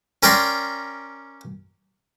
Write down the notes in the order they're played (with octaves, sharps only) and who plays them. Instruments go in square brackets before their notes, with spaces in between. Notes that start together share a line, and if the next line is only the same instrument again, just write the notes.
[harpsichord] C#4 A#4 D5 G5 A#5 C6